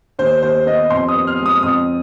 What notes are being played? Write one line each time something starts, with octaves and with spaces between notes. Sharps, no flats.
D#2 C5
D#2 C5
B3 D#5
F2 C6
D#6
B3
F6
G#3
D#6
F2 D#6